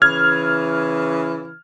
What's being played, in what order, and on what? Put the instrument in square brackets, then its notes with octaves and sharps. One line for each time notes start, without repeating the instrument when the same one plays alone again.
[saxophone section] C#3 E3 [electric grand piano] F6 G#6